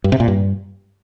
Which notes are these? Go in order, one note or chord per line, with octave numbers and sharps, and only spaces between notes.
G2
C3
A#2
G2